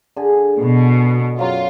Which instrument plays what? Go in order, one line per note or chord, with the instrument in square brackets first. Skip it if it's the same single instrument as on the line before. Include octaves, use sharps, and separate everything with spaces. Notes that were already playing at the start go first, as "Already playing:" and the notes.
[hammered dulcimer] D3 G#4
[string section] B2
[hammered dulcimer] F#2 F#3 F5 [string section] F4